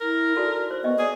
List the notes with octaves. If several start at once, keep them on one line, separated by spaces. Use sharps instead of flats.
E4 A#4
D#4 F#4 A4 D5
C5
B3 D#5 G5 C#6
G#4 D5